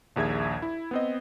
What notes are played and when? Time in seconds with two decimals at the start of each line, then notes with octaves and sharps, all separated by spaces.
0.16 A#1 D#2 G#4 E5 G#6
0.62 E4
0.91 B3 C4 D#5